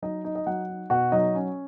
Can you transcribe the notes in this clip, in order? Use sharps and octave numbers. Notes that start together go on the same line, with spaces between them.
F#3 D#4 D#5
D#4
D#5
F#3 F#4 F#5
D#4
B2 F#4 F#5
F#3 D#4 D#5
C#4